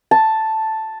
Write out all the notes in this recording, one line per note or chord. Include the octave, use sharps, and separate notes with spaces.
A5